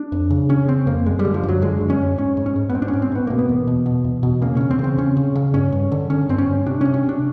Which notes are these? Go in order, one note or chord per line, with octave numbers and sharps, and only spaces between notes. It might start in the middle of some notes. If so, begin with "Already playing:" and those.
Already playing: D4
F2
C#3
C#3 C#4
C#3 C4
F2 A#3
F#2 G#3
G3
D3
F3
F#2
F#3
D3 G#3
F#2
C#4
F#2
G#2 C#4
G#2
C#4
G#2
B3
G#2 C4
D4
C#4
G#2
C4
G#2 B3
B2 A#3
B3
E2
B2
B2
E2
B2
C#3 A#3
E2 C#4
C4
C#3
C4
C#3 C#4
C#3
C#3
G2 C#4
G2
D3
D3 C#4
G2 C4
C#4
G2
C3 D4
C#4
C3
C#4
C3
D4